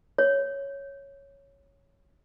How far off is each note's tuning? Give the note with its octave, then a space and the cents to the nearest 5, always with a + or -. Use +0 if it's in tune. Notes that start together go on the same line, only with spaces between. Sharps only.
C#5 +0